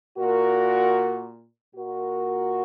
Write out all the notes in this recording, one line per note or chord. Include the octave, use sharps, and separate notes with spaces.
A#2 F#4 A#4
A#2 F#4 A#4